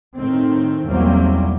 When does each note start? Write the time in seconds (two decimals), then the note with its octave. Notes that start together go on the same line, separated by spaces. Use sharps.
0.16 A2 D#3 C4
0.87 B1 E2 F#3 G3 A#3 C4